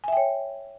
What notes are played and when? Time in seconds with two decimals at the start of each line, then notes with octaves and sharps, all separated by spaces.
0.04 G#5
0.08 E5
0.13 G5
0.17 C#5